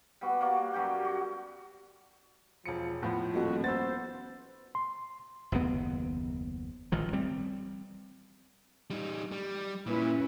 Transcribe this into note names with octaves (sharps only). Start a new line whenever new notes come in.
G3 B3 F#4
A#3 F#4 D5
F#2 G3 F#4 G5
F#4
E1 F3 C#7
A2 F3 B3
D#1 F2 F#4
B3 C5 E6 A6
C6
F#1 D#2 C3 B3
A1 D#3 F3
G3 C4
G3 D#4
G3
A#2 C#4 E4 B4